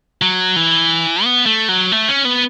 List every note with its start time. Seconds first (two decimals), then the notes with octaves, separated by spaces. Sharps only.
0.22 F#3
0.56 E3
1.24 B3
1.46 A3
1.69 F#3
1.92 A3
2.08 C#4
2.25 B3